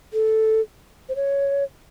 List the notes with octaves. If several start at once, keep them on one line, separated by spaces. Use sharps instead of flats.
A4
C5
C#5